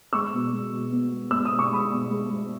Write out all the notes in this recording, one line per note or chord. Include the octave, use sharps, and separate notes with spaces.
G#3 C#6 E6
B2
G#3
B2
B3
G#3
G#3 E6
D#6
B2
C#6
G#3 B5 D#6
B2
G#3
G#3